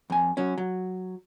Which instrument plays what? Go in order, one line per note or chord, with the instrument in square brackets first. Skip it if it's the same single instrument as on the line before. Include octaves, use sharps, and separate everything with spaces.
[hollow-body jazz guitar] F2 G#5
F#3 C#4
F#3